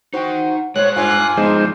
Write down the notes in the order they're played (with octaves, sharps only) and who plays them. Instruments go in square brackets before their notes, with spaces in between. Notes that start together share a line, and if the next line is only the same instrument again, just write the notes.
[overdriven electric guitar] D#4 G5 [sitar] F#4 C5
[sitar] A#2 [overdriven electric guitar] G#3 C5 [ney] C#5 [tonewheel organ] F#6
[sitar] G2 A#2 F4 [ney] G#5
[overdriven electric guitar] F3 B3 [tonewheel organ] G#3 D#4 C5